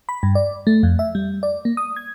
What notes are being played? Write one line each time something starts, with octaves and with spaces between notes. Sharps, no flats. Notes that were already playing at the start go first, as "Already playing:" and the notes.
B5
G2
D5
A3
F2
E5
G3
D5
A#3
D#6
G#6